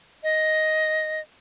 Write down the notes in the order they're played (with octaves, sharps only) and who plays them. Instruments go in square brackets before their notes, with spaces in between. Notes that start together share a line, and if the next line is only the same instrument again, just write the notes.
[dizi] D#5